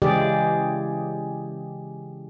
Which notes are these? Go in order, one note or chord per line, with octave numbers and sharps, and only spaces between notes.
C#3 E3 G#3 G4 G#4 D5